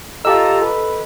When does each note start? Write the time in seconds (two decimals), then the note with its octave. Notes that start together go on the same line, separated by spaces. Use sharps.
0.25 F4 G4 A4 D#5 A#5 E6
0.62 A4 B4